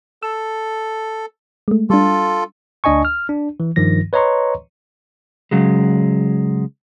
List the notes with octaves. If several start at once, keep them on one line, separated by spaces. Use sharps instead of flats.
A4 E6
G#3 A3
G3 D4 F4 A4
D2 D4 D#5 G#5 C#6
F6
D4
E3
G2 D#3 F3 A#6
B4 C#5 D#5 A#5 C6 C#6
C#3 F#3 G#3